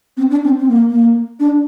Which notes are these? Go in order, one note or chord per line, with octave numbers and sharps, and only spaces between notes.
C4
D4
C4
C4
A#3
A#3
D4